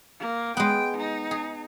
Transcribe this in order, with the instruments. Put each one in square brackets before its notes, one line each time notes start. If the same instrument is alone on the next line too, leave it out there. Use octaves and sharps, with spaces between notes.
[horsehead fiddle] A#3
[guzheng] G#3 B3 [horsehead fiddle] G5
[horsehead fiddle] D#4
[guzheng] G#4